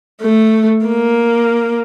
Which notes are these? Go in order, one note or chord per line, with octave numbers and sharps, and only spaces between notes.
A3
A#3